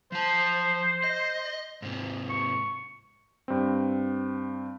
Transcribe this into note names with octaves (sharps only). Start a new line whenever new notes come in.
F3 C5 A5
D#5
G#2 C3
C#6
G2 C4